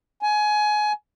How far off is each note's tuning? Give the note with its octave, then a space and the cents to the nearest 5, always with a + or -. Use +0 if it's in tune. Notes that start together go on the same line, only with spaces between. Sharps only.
G#5 +20